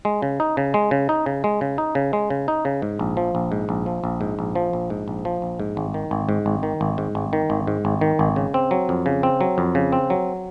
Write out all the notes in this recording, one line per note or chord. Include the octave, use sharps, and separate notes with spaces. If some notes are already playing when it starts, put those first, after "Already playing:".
G#3
C#3
D#4
C#3
G#3
C#3
D#4
C#3
G#3
C#3
D#4
C#3
G#3
C#3
D#4
C#3
G#2
A#1
F3
A#1
G#2
A#1
F3
A#1
G#2
A#1
F3
A#1
G#2
A#1
F3
A#1
G#2
G#1
D#3
G#1
G#2
G#1
D#3
G#1
G#2
G#1
D#3
G#1
G#2
G#1
D#3
G#1
C#3
C4
F#3
F2
C#3
C4
F#3
F2
C#3
C4
F#3